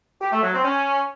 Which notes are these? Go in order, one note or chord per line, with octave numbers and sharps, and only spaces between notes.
G4
A3
F#3
C4
C#4